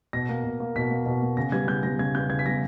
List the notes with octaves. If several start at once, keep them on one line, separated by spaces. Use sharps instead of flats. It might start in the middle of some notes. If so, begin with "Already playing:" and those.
B2 A#6
A#3
B2
A#3
B2 B6
A#3
B2
A#3
C#3 A#6
G3 B3 G#6
C#3 G6
G3 B3 A#6
C#3 G#6
G3 B3 G6
C#3 G#6
B6
G3 B3 A#6